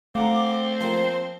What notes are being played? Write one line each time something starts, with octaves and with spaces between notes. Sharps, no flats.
A3 C4 F5 F#5 A#5 D6
F3 A#3 C5